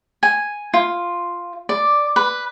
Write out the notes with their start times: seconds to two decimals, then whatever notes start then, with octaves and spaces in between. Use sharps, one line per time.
0.23 G#5
0.74 F4
1.69 D5
2.16 B4